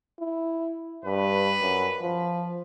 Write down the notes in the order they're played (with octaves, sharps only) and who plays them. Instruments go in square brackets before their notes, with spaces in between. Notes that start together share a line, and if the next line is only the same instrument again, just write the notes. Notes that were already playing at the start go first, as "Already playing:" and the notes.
[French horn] E4
[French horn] G2 [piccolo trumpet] B4
[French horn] F#2
F3